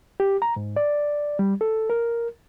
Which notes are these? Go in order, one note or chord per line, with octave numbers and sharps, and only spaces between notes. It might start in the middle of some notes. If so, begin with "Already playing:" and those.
G4
A#5
G#2
D5
G3
A4
A#4